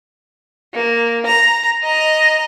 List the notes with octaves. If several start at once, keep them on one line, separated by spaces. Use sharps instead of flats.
A#3
A#5
D#5 A#5